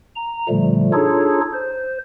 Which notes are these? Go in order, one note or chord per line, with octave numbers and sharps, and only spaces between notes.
A#5
A#2 D3 F3 G3 A3
D4 D#4 F4 G#4 A4 C#5
C5